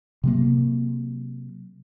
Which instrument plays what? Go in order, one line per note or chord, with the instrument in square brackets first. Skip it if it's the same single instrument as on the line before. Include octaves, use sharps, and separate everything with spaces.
[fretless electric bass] C3 F#3 A#3